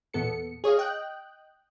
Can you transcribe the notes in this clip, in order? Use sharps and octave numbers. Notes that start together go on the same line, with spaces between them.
E2 A#2 B3 A4 C#7
G#4 C#5 D#5 F5
D#5 G5 F#6